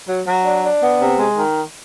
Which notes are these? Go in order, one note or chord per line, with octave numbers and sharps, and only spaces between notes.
F#3
F#3
D4
D4
B3
C3
G#3
D#3